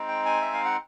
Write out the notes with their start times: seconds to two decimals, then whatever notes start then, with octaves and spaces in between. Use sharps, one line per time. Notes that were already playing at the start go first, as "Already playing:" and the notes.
Already playing: G#3 C4 D#4
0.09 G5
0.26 G#5
0.41 E5
0.54 F5
0.65 F#5